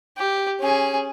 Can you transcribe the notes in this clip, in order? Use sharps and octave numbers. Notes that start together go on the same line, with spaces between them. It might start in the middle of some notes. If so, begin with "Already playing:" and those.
G4
C#4 G#4